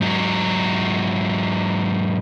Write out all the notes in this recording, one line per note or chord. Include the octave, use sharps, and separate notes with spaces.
G#2 F#3